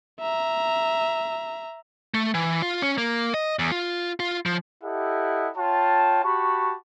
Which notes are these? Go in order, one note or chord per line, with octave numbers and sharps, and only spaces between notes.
E5 A#5
A3
E3
F4
C#4
A#3
D#5
E2
F4
F4
F3
E4 G4 A4 D#5 F#5
F4 C#5 G5 A5
F#4 G4 A5 B5 C#6